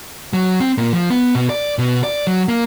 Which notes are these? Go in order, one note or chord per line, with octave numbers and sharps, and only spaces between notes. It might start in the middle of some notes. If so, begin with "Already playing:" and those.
F#3
C4
A#2
F3
B3
B2
D5
B2
D5
F#3
A#3